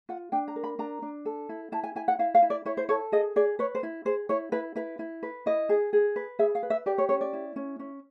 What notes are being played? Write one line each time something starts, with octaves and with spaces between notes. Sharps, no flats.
F4 F#5
D4 G5
A#5
A#4
B5
D4 A#5
D4
A4
E4
E4 A5
G#5
E4 G#5
F#5
E4 F5
F5
E4
D5
E4 C#5
C5
A4 C#5
G#4 D#5
G#4 D5
B4 C#5
C5
E4
G#4 C5
E4 C#5
E4 B4
E4 B4
E4
B4
E4 D#5
G#4
G#4
B4
G#4 E5
F5
B4
E5
G4 D5
C#5
C#4 C#5
D5
E4
C#4
C#4